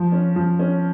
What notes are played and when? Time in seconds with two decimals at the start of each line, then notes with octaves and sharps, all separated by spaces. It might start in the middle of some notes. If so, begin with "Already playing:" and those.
Already playing: F3
0.12 C#4
0.36 F3
0.59 C#4